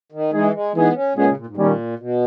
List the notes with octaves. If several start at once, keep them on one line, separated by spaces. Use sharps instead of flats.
D#3
E3 G#3 D#4 G#4
G#3
E3 G#3 B3 D#4 G#4
C#4
A#2 G#3 B3 C#4 G#4
C#3
A#2
G#2
A#2 D#3 G3 A#3 C#4
B2